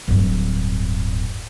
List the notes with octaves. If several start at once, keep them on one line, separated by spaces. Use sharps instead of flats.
D1 G2